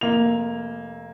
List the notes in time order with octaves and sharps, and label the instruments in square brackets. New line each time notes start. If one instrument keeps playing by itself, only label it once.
[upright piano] F1 A#3 F7